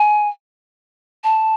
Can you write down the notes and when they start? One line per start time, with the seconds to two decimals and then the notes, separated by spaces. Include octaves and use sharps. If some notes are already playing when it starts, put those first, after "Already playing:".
Already playing: G#5
1.24 A5